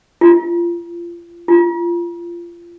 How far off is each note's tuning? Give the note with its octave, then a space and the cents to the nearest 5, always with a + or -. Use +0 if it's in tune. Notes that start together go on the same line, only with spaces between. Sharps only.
F4 -30
F4 -25